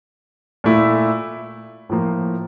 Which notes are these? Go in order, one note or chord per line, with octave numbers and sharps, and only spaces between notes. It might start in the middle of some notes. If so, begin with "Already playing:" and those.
A#2 A3 E4
A2 F3 A#3